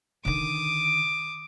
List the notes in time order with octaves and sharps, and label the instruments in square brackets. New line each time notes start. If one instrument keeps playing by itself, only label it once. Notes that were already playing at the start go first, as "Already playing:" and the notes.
[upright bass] D3 D#3 [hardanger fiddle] D6 D#6